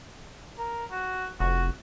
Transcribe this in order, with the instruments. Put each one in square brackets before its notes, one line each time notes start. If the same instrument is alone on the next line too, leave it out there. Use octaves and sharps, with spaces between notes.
[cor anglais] A#4
F#4
[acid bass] F1 [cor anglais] F#4